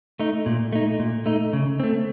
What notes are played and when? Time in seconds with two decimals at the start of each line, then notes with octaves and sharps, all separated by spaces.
0.19 A3 D#4
0.46 A#2
0.73 A3 D#4
0.99 A#2
1.26 A3 D#4
1.53 C#3
1.80 A3 C4